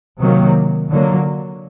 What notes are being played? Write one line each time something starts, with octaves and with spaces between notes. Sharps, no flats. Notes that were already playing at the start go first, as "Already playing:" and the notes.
C3 D#3 F#3 A#3
D3 F#3 A#3